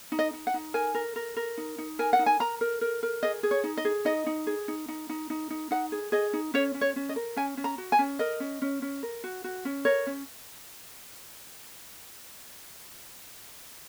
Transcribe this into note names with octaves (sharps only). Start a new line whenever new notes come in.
D#4
D#5
D#4
F#5
D#4
A#4 G#5
A#4
A#4
A#4
D#4
D#4
A#4 G#5
F#5
D#4
G#5
A#4 A#5
A#4
A#4
A#4
G#4 D#5
G#4
C#5
D#4
D#5
G#4
D#4 D#5
D#4
G#4
D#4
D#4
D#4
D#4
D#4
D#4 F#5
G#4
G#4 D#5
D#4
C#4 C#5
C#4
C#5
C#4
D#5
A#4
C#4 G#5
C#4
A#5
F#4
G#5
C#4
A#4 D#5
C#4
C#4
C#4
A#4
F#4
F#4
C#4
A#4 C#5
C#4